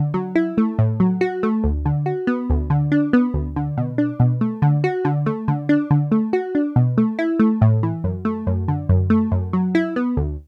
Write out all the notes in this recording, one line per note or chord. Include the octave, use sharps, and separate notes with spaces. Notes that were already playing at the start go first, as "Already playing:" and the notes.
Already playing: D3
F#3
E4
A3
A2
F#3
F#4
A3
D2
D3
F#4
B3
D2
D3
D4
B3
D2
D3
B2
D4
B2
A3
D3
F#4
D3
A3
D3
D4
D3
A3
F#4
D4
B2
A3
E4
A3
A2
E3
F#2
A3
F#2
D3
F#2
A3
F#2
F#3
E4
B3
D2